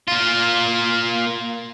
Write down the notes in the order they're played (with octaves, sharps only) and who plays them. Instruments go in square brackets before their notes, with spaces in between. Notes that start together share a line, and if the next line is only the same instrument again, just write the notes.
[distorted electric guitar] A#3 F4